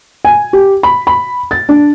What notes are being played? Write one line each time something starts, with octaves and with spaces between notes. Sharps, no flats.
G#5
G4
B5
B5
A6
D4